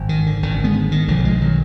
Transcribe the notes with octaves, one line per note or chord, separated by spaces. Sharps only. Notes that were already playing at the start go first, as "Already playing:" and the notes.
Already playing: G#1 F#2
D#3
D3
G#1 F#2 D3 D#3
G#3 B3
D#3
B1 A#2 D3 F3
F3 G#3
D#3 F#3